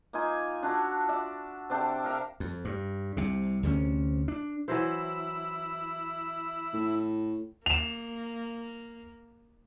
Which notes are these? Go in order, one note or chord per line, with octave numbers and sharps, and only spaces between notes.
A#3 D#4 F4 G#5
D4 F4 F#4 A4
D5 E5 F#5
C3 D4 A4 G5
A4 A#4 E5 F5
F2
G2
C2 C3
D2 C3 E3 C#4
D4
E3 F#3 E4 C5
A2
A#3 E7 F7